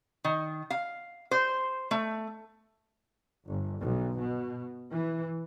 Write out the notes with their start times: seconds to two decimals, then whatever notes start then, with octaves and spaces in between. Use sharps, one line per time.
0.24 D#3
0.70 F5
1.31 C5
1.91 A3
3.46 G1
3.82 B1
4.21 B2
4.92 E3